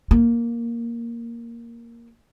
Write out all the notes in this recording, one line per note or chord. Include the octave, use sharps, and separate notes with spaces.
A#3